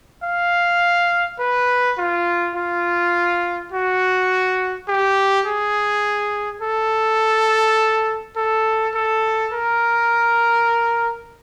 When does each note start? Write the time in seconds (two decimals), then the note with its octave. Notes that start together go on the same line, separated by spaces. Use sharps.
0.23 F5
1.39 B4
1.98 F4
2.56 F4
3.72 F#4
4.88 G4
5.46 G#4
6.62 A4
8.37 A4
8.95 A4
9.53 A#4